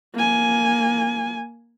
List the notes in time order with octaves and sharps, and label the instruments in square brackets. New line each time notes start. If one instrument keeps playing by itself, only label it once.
[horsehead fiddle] A#3 G#5